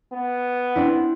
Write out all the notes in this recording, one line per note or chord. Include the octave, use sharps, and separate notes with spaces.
B3
C4 D4 E4